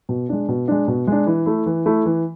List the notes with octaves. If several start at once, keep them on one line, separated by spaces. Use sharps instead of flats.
B2
G#3 D4
B2
G#3 D4
B2
G#3 D4
E3
A3 E4
E3
A3 E4
E3